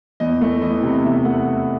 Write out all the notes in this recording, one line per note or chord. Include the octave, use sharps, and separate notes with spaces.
E2 D#5
A3
E3 D#5
C3
E2 E5
A3 F#5